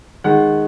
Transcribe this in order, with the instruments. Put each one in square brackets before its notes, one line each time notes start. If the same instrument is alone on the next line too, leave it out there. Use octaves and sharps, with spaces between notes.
[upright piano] D#3 G#3 F#5